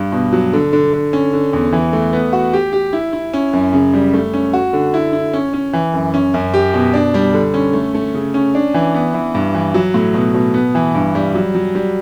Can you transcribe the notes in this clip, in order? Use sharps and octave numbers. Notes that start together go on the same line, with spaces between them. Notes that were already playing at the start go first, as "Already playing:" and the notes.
Already playing: G2
B2
F#3
D3
D3
D3
C#4
D3
E2
E3
A3
B3
F#4
G4
G4
E4
E4
C#4
F#2
C#3
G3
A3
C#4
F#4
D3
E4
E4
C#4
C#4
E3
F#2
C#4
F#2
G4
B2
D4
G3
D3
C#4
A3
A3
C#3
C#4
D4
E3
B3
E3
G2
E3
F#3
A2
B2
B2
B3
E3
G2
G3
F#3
F#3
G3